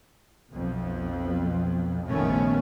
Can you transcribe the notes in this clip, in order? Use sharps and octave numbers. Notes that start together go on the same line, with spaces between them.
B1 F2
F1 A#1 D#3 A3 B3 C#4